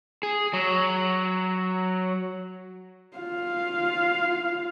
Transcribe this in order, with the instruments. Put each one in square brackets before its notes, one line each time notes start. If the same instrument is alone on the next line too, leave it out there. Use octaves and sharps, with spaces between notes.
[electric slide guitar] G#4
F#3
[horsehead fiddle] F4 F5